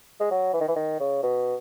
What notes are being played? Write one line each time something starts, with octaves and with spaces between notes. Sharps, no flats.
G#3
F#3
E3
D#3
E3
D#3
C#3
B2